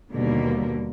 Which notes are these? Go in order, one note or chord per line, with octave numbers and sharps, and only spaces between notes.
D#2 B2 D3 G3 A#3